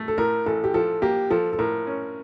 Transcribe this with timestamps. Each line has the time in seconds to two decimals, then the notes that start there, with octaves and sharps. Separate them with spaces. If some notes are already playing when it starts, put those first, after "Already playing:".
Already playing: A3
0.08 A4
0.18 A2 A#4
0.46 A1 A4
0.64 G4
0.74 F3 A4
1.02 A#3 G4
1.30 F3 A4
1.53 A4
1.59 A2 A#4
1.87 C#4